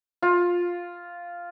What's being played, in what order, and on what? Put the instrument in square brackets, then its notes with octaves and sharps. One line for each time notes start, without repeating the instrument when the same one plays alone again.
[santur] F4